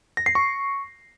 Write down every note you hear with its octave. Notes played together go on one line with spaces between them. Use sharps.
A#6
C7
C#6